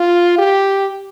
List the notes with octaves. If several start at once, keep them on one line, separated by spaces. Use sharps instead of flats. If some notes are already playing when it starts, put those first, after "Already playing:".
Already playing: F4
G4